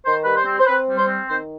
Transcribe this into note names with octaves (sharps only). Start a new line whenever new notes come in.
D#3 C5
G3 B4
C5
C4
C5
C4 B4
G3
C5
C4
D#3 C5